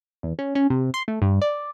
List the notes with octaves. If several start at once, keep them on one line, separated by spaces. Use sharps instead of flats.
E2
C#4
C#4
C3
C6
A3
G2
D5